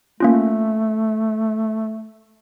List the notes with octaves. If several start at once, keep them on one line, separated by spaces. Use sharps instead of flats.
A3 A#3 C#4 F4